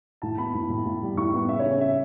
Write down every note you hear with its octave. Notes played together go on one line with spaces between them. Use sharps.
A2 A5
B3 B5
A2
A2
A2
G3
A2 C#6
B3
C#3 E5
C#5
C#3
C#3 E5